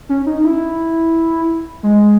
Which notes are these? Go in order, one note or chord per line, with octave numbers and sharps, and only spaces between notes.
C#4
D#4
E4
G#3